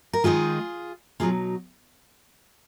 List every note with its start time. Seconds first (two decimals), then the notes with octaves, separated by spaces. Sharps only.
0.13 A#4
0.24 D#3 G#3 B3 D#4 F4 G#4
1.20 B2 F#3 B3 D#4 F4 G#4